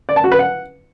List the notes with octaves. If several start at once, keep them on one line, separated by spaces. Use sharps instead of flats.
D5
A5
F#4
B4
F#5